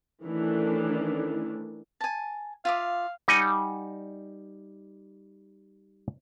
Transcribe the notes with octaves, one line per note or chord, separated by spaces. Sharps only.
D#3 E3 A3 C#4 D4
G#5 A5
F4 E5 F5 D6
G3 D#4 D#5 F#5 G#5